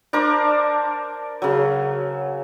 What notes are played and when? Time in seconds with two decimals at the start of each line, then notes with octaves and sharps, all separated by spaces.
0.13 D4 A#4 C5 D6
1.42 C#3 F#3